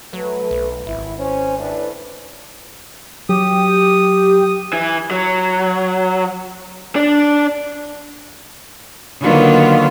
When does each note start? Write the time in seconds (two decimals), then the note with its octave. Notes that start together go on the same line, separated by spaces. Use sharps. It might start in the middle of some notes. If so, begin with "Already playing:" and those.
0.13 F#3 A3 B4
0.51 B1
0.86 G#1 E4
1.19 C#4 C5
1.59 A2 D4 B4
3.29 F#3 G4 D#6
4.73 E3
5.11 F#3
6.96 D4 D5
9.21 D3 D#3 F#3 A#3 B3 F4